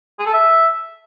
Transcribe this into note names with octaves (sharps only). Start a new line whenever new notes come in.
G#4
A4
E5